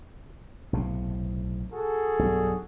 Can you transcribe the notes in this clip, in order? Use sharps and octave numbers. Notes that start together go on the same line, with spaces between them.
B1 A2 C3
F#4 G#4 A4
B1 G2